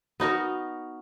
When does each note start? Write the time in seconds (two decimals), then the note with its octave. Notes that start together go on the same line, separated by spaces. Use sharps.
0.20 B3 D#4 F#4 A#4